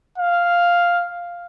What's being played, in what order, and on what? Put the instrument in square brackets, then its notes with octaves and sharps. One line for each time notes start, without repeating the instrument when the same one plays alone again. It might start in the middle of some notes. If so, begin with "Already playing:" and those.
[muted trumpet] F5